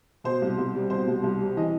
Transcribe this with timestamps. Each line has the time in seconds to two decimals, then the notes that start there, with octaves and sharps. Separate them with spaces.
0.24 B2 C5
0.41 C2
0.57 C2
0.75 G3
0.90 B2 C5
1.08 C2
1.23 C2
1.40 G3
1.57 E3 D#5